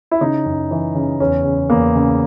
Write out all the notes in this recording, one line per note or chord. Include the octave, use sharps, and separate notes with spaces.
E4
C#3 D#4
F#2
E3
C#3
E2 C#4
C#3
E2 A#3
C#3